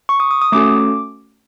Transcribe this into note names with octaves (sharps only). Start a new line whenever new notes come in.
C#6
D#6
D#6
D#6
A3 C#4 F#4 A4 D6